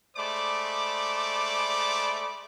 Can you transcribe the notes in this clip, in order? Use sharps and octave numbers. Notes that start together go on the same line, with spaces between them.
G#3 A3 C5 D5 B5 D6